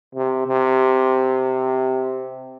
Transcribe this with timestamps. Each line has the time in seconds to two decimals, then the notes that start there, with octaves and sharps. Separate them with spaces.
0.15 C3
0.47 C3